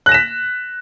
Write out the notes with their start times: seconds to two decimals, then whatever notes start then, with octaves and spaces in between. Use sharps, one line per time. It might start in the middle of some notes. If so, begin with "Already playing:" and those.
0.06 F#6
0.09 A#6
0.12 E7
0.14 B6